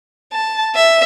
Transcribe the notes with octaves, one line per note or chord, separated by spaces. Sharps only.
A5
E5